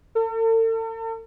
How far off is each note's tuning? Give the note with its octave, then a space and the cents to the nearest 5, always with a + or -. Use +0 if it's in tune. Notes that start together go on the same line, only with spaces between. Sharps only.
A4 +45